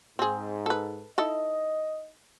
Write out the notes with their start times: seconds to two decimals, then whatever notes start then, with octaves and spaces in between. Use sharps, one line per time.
0.19 G#2 C4 G#4
0.66 A4 B4
1.18 D#4 E4 A4 D#5